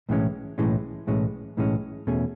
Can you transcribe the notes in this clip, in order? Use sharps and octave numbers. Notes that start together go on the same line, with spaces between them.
B1 A2 E3 G#3 C#4
B1 A2 E3 G#3 C#4
B1 A2 E3 G#3 C#4
B1 A2 E3 G#3 C#4
E2 B2 A3 C#4 G#4